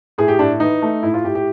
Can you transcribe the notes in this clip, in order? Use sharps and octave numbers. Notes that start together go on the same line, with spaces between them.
A2 G#4
G4
A2 D4
E3 D#4
A3
A2 E4
F4
A2 G4
G4